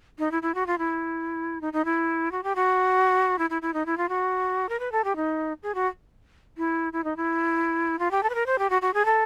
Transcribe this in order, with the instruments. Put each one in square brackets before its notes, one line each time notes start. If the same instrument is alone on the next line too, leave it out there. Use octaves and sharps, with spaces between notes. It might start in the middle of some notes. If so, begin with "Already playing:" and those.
[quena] D#4
E4
E4
F#4
F4
E4
D#4
D#4
E4
F#4
G4
F#4
E4
E4
E4
D#4
E4
F4
F#4
A#4
B4
A4
G4
D#4
G#4
F#4
E4
E4
D#4
E4
F4
G4
A4
B4
A#4
C5
G4
F#4
F#4
G#4
A4